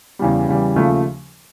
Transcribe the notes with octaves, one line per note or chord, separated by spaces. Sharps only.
E2 C#3 E3 G3
E2 C#3 E3 G3
D#2 C#3 F3 A3